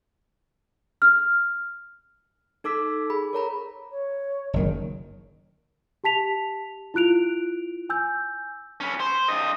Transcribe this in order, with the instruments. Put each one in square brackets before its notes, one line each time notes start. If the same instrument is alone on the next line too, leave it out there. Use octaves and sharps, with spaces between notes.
[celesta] F6
[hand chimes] D#4 A4 D6 E6 B6
G#4 B5
A#4 C#5 A#5 B5
[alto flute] C#5
[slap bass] F#1 D#3
[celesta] G4 A5 B6 F7
E4 F4 F#6 D7 F7
G#5 E6 G6
[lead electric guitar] C#4 B4
C5
G2 D#5